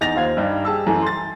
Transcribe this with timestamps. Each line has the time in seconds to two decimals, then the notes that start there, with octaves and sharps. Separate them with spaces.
0.01 E2 D#4 A6 A#6 F7
0.16 D#2 F4 C5 F5 G#6
0.37 G2 G3 D#4
0.65 G4 G#4 A5 E6
0.86 F#2 E3 A3
1.02 C6 A6